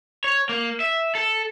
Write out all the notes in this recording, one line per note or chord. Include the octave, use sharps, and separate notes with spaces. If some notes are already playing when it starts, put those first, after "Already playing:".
C#5
A#3
E5
A4